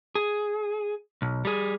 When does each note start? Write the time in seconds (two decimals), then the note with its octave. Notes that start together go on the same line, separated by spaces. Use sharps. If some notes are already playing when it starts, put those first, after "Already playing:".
0.15 G#4
1.22 B1
1.45 G3 G#4